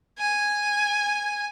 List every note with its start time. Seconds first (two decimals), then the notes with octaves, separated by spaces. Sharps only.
0.19 G#5